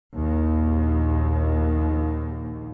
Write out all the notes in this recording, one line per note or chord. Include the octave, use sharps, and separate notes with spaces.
A#1 D#2